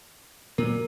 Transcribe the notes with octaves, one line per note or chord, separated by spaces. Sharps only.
A#2 F#3 A#4